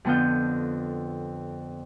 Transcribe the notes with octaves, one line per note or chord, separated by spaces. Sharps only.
F2 D3 B3 F4 G6